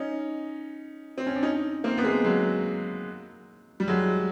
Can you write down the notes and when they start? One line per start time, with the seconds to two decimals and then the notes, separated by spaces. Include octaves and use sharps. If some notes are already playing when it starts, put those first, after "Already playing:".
Already playing: C#4 D#4
1.18 C4
1.27 C#4
1.35 D4
1.43 C#4 D#4
1.84 A#3 C4
1.98 B3
2.04 G#3 A#3
2.24 F#3 G#3
3.80 G3
3.88 F#3 G#3